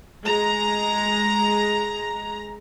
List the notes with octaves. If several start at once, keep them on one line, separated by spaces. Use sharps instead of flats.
G#3 A#5